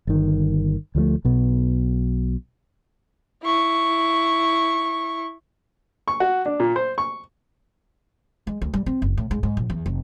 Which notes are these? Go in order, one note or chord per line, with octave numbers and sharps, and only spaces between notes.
G1 D#3
D2 F3 F#3 A3
B1 B2
E4 C#6
C#6
F#4
D4
A#2
C5
C#6
G#3
D2
G3
C4
F#1
A2
G#2
G#2
A#1
E2
F1